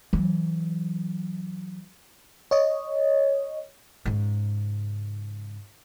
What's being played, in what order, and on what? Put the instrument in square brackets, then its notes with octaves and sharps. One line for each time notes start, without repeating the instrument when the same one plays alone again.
[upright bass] E3 F#3
[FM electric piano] C#5 D#5
[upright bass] G#2 C#3